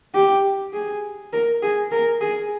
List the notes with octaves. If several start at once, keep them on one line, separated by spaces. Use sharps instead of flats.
G4
G#4
A#4
G#4
A#4
G#4